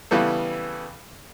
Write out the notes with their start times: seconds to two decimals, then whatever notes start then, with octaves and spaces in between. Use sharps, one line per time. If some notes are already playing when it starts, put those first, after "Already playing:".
0.11 C#3 E3 G3 B3 A4